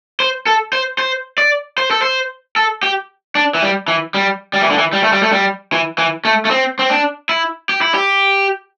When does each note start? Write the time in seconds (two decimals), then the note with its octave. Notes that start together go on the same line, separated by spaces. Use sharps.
0.20 C5
0.47 A4
0.73 C5
0.98 C5
1.38 D5
1.78 C5
1.91 A4
2.02 C5
2.56 A4
2.83 G4
3.35 D4
3.55 E3
3.62 G3
3.88 E3
4.14 G3
4.54 G3
4.62 E3
4.71 D3
4.79 E3
4.93 G3
5.04 A3
5.12 G3
5.23 A3
5.32 G3
5.73 E3
5.98 E3
6.25 A3
6.45 A3
6.51 C4
6.79 C4
6.90 D4
7.29 E4
7.69 G4
7.81 E4
7.94 G4